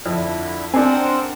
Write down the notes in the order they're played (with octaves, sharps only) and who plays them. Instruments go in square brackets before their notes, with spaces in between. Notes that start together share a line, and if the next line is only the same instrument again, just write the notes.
[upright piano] F2 [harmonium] D3 E4
[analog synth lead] C4 [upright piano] D4 G#5 [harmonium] A#4 C5 F#5